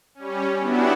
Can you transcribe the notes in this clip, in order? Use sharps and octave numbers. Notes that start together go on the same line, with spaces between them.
G3 C#4
B3 D4 E4 F#4 G4